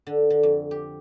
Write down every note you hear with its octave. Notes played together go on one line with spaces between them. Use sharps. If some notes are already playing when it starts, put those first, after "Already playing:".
D3
D3
F2
G4